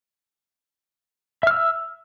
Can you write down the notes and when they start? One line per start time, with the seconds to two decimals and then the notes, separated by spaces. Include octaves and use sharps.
1.43 E5
1.47 F6
1.51 E6